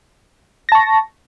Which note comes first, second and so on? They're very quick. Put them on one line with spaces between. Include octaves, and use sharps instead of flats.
A#6 A5 C#6